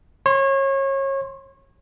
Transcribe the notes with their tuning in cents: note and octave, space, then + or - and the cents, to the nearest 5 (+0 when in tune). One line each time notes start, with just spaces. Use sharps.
C#5 -30 C6 +0